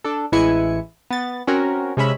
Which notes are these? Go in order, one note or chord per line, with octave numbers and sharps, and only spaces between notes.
D4 A4
A1 E3 G#3 E4 G#5 C#7
B3 A6
C4 C#4 F#4 A#4 C#5
C3 G#3 C#4 E5 B5